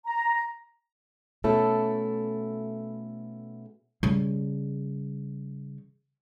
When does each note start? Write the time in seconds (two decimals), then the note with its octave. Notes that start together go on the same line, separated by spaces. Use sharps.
0.07 A#5
1.44 B2 A3 C#4 E4 A4
4.03 C#3 G3